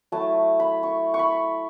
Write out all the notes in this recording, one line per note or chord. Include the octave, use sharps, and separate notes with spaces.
F#3 A3 E4 A5
B5
C#6
C#6
B5